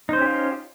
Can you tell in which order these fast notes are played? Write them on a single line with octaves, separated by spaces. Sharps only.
D#4 C5 C#4 G4 F4